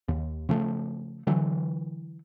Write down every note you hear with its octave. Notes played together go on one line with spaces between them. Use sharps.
D#2
C#3 F3 A3
D3 E3 F#3